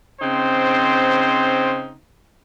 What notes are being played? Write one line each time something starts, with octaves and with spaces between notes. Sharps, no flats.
C#3 C4 D#4 C5